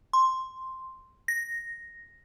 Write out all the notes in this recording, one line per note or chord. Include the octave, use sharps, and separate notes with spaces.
C6
A#6